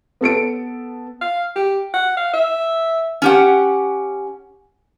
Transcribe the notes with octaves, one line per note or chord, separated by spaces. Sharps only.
B3 A4 C#7 D7
F5
G4
F#5
F5
E5
C#4 G4 F#5